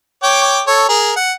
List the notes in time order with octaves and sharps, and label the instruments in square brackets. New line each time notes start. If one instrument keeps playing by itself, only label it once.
[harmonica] C#5 G5 D6
A4 C#5
G#4 A#4
F#5